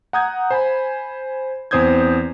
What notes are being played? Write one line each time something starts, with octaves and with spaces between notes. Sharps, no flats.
F#5 A#5 D#6 G6 G#6
C5 G#5 B5
E2 C4 C5 D#6 G6 G#6